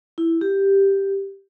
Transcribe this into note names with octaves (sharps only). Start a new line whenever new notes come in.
E4
G4